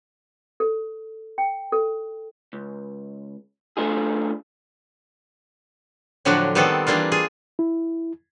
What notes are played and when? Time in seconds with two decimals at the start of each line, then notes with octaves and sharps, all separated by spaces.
0.60 A4
1.38 G5
1.72 A4
2.53 C#2
3.77 A3 D4 F4 G#4
6.25 A2 D3 F3 F#3 D4 F#4
6.55 D#3 G3 B3 C4 A4
6.87 E3 G3 A#3 D4 F4
7.12 F4 G#4
7.59 E4